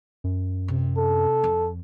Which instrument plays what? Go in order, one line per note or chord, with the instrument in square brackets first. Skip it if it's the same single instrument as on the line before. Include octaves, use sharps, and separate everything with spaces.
[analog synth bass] F#2
[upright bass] C3
[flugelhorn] A4
[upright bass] F2